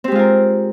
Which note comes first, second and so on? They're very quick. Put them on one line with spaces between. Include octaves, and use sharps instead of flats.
C4 G4 G#3 F4 A#4